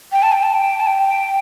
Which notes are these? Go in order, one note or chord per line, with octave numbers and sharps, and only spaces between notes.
G5
A5
G5
A5
G5
A5
G5